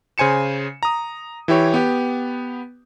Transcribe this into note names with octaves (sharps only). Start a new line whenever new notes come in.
C#3 C5 G#5 C#7 E7
A#5 D#6
E3 E4 G4 C#5
B3 G4